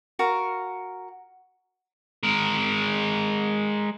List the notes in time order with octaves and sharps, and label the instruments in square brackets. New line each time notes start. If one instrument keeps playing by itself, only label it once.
[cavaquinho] F#4 A#4 F5
[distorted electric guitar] G#3 A#4